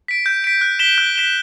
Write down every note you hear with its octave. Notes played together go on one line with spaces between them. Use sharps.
B6 D7
G6
B6 D7
F#6
B6 E7 G7
F#6
B6 E7 G7